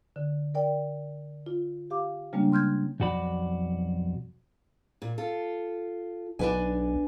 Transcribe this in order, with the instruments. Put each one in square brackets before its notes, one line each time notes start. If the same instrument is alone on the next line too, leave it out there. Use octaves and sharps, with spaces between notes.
[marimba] D3
A#4 D5 G5
F4
G4 F5 D6
C#3 G3 G#3 A#3 C#4 D4
C6 F6 G6 G#6
[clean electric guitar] B1 F2 F#4 D5 B5
[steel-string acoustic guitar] A#2
F4 A4
[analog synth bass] B1 [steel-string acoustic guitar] D4 B4 G#5